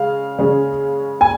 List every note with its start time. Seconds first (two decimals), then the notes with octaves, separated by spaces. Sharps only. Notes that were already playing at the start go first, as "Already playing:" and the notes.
Already playing: C#3 G#3 F5
0.38 C#3 G#3 C#4
1.21 G#5